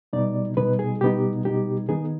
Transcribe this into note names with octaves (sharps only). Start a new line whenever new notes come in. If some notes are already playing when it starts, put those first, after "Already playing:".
B2 G3 B3 D#4 D5
B2 G3 B3 D#4 B4
G#4
B2 G3 B3 D#4 G4
B2 G3 B3 D#4 G4
D#3 B3 D#4 G#4